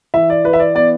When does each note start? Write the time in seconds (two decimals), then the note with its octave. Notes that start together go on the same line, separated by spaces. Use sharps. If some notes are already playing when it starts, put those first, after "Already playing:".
0.14 E3 E5
0.30 D5
0.44 E3 B4
0.53 E5
0.59 D5
0.75 B3 D5